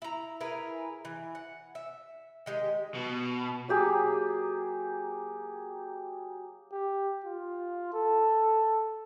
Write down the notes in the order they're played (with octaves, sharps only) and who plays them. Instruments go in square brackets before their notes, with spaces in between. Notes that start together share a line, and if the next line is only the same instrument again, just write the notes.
[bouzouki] E4 A#5
E4 G#4 A#4 B4
E3
F#5
E5
D#3 G#3 G4
[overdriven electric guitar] B2
[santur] F#3 A#3 G4 G#4
[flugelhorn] G4
F4
A4